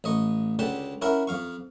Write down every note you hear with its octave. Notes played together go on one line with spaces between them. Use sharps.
A1 D#5 C#6
C#2 D3 G4 F#5 A5
C#4 E4 A#4 F#5
F2 F5 C#6